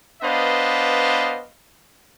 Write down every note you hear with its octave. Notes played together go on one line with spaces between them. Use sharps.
B3 D4 B4 C5 D#5 F5